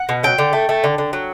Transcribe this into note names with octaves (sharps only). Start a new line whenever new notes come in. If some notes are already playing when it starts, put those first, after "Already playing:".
Already playing: F#5
B2
F#3 G5
D3
A3
A3
D3
D3
F#3